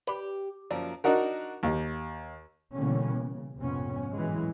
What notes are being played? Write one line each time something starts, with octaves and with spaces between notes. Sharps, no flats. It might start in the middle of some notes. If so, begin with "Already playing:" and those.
G4 B4 D5
F#2 F3 A#3 D5
D4 D#4 F#4 A#4
D#2
B2 D3 E3 G3 A#3 C#4
C#3
A#1 F2 G#2 C3 B3 C#4
A2 E3 F#3 G#3